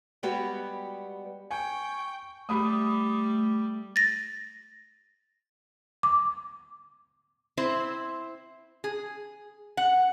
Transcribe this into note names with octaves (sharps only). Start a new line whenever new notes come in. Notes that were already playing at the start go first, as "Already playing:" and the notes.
G3 G#3 B3 F#4 G4 B4
G5 G#5 C#6
G3 A3 B5 D#6
A6 A#6
D6
C4 E4 C5
G#4
F#5